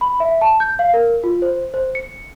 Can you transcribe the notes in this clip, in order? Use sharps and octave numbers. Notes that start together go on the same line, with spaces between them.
B5
E5
A5
G6
F5
A#4
F4
C5
C5
C#7